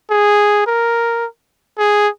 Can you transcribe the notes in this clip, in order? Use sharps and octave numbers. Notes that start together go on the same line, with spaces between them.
G#4
A#4
G#4